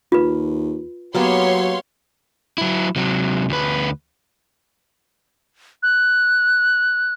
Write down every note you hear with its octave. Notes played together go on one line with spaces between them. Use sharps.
D#2 F4 B4
F#3 A#3 B3 G4 C#5 F5 C6
F#3 E4
C3 F#3
D2 B4
F#6